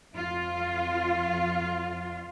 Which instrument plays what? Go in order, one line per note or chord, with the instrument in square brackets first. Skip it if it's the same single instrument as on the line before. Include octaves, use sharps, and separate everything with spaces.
[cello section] F2 F4